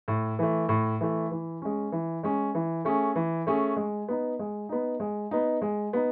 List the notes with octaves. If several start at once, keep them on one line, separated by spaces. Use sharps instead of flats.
A2
E3 A3
A2
E3 A3
E3
G#3 C#4
E3
G#3 C#4
E3
A3 C#4 G#4
E3
A3 C#4 G#4
G#3
B3 D#4
G#3
B3 D#4
G#3
B3 D#4
G#3
B3 D#4